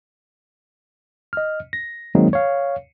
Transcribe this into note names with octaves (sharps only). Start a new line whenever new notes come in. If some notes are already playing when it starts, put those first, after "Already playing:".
D#5 F6
A#6
D#3 F#3 G#3 A#3 C4 D#4
C#5 F5